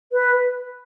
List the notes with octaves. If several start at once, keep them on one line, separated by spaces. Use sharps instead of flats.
B4